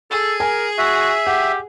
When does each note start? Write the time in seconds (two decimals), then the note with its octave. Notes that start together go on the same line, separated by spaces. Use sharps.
0.11 G#4 A4
0.40 A#4 G#5
0.78 F#4 E5
1.27 G4 F#5